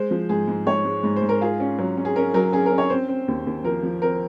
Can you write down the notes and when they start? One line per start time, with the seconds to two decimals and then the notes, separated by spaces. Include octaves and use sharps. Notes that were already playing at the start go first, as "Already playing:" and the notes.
Already playing: G#3 C5
0.11 F3
0.29 G#2 G#4
0.48 G#2
0.66 G#2 C#5
0.85 G#3
1.03 G#2
1.16 C5
1.22 G#2
1.29 A#4
1.41 F4 G#4
1.60 C#4
1.79 F#3
1.97 C#4
2.05 G#4
2.16 C#4 A#4
2.34 F#3 A#4
2.52 C#4 G#4
2.66 A#4
2.72 C#4
2.78 C#5
2.90 C4 C5
3.09 C4
3.28 D#2
3.47 D#2
3.64 F3 A#4
3.83 F3
4.02 C4 A#4